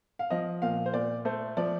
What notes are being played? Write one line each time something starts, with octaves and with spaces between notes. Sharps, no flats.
F5
F3 D#5
A#2 F5
C5
A#2 D5
A3 C5
F3 D5